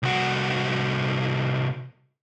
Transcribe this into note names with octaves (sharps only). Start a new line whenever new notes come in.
C2 F#4